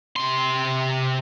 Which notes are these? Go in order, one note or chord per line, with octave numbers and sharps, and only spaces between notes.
C3 C6